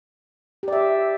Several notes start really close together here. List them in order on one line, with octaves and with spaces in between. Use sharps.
G4 D5 E5